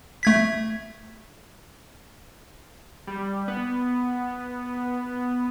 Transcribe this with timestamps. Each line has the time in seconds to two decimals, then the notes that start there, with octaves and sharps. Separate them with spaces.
0.23 A3 G#6 B6
3.07 G3
3.48 B3